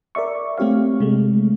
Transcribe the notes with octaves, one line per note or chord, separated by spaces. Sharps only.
A#4 D5 E5 C#6
A3 C4 G4 C#5 F5
C3 G#3 A3